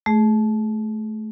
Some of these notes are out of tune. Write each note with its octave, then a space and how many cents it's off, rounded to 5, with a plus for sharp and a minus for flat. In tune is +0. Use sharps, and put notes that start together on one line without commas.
A3 -20 G#4 +0